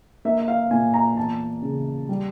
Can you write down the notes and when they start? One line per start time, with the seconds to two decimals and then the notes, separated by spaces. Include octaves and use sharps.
0.25 A#3 E5
0.39 E5
0.48 F5
0.71 A#2 G#5
0.94 A#5
1.17 E2 A5
1.62 C#3
2.09 G3